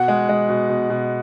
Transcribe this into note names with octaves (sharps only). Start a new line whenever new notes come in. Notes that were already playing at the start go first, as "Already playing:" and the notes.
Already playing: B2 F#5
G#3
G#3
B2
B2
B2